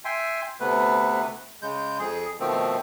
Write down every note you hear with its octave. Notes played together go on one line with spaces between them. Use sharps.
E5 G5 G#5 C6
D2 C3 A3 B3 B4
C#3 G#3 G6
F2 G#4
B2 D#3 F3 A3 C4